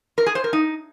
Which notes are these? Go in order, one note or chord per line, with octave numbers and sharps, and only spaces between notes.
A#4
G#4
C5
A#4
D#4